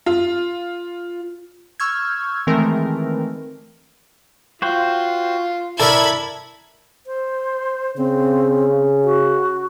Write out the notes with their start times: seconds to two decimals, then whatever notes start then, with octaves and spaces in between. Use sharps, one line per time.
0.06 F4
1.80 C#6 E6 F6 G6 G#6
2.47 D#3 E3 G#3 A3 C4 A#4
4.62 F4 F#4 C5 G5
5.80 E4 A4 A#4 D5 A5 B5 G#6
7.07 C5
7.97 C#3 C4
9.04 F#4